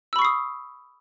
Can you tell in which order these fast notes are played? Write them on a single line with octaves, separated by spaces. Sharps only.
E6 B5 C#6 C7 D#6